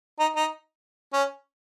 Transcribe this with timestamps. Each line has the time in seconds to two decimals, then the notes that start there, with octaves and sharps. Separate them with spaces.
0.19 D#4
0.36 D#4
1.13 C#4